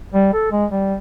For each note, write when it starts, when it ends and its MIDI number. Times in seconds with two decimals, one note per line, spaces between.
0.14 0.30 55
0.33 0.51 69
0.52 0.65 56
0.71 0.95 55